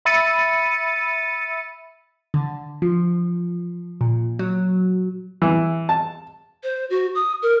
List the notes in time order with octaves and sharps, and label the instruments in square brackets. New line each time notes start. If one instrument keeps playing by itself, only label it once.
[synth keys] E5 B5 E6 A6 C#7 D#7
[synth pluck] D3
F3
A#2
F#3
[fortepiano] E3
A5
[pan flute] C5
F#4
D#6
A#4